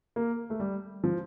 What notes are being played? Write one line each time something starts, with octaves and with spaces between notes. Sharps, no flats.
A#3
A3
G3
F3